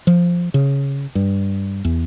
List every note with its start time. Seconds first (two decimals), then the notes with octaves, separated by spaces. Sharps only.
0.07 F3
0.54 C#3
1.15 G2
1.85 E2